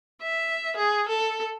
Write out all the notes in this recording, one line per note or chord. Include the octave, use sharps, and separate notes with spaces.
E5
G#4
A4